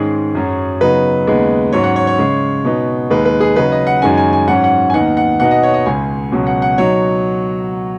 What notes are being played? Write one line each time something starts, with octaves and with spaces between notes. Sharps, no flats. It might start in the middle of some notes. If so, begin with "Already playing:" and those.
Already playing: G#2 D#3 G#3 C#4 G#4
F#2 F#3 C#4
C#3 F#3 B3 D#4 B4
D#2 C#3 G#3 B3 D#4
G#2 F#3 C#4 C#5
F#5
C#5
C#5
C#3 G#3 C#4
B2 B3 D#4
D#2 D#3 G#3 D#4 B4
B4
G#4
C#3 F#3 D#4 B4
D#5
F#5
F#2 D#3 G#3 C#4 G#5
G#5
G#5
G#2 F#3 C#4 F#5
F#5
G#5
D#2 D#3 B3 D#4 F#5
F#5
B2 B3 D#4 F#5
D#5
C#5
D#5
C#2 C#3 G#3 G#5
C#2 B2 F#3 C#4
F#5
F#5
B2 F#3 D#4 C#5